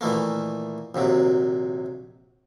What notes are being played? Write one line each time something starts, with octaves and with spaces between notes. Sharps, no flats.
A#2 D#3 E3 A3 A#3
A#1 D#2 C3 F#3